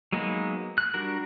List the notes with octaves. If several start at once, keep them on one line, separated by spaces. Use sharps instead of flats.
F#3 G#3 A#3 B3 D#4
F#6
G3 D4 F#4 A#4